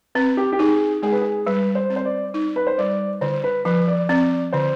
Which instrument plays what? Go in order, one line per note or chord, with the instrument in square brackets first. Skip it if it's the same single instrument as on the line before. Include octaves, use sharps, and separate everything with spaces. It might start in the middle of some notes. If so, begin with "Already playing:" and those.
[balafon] C4 [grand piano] B4
[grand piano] G4
G4
[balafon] D#4 [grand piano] G#4
[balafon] G#3 [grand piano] G#4
[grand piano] B4
G#4
[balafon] G3 [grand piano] B4
[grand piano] C5
[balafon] C4
[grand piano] C5
D5
[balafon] D#4
[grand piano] B4
C5
[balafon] G3 [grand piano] D5
[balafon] D3 [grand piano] C5
[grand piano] B4
[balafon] F3 [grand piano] B4
[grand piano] D5
[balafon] C4 [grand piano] D5
[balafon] D3 [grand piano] C5